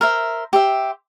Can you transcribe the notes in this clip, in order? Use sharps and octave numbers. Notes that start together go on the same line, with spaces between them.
A#4 C5 E5
G4 C5 E5